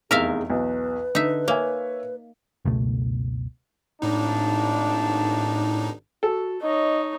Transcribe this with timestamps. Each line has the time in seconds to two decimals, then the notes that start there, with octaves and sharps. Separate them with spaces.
0.11 F1 E2 D#4 G#4 A#4 E5 F5
0.50 B1 E2 B4
1.15 D3 D#4 E5
1.48 A#3 C#5 E5 G#5
2.65 F#1 C#2 B2 A3
4.02 G#1 A2 D4 D#4
6.23 F#4 A4
6.62 D#4 C#5 D#5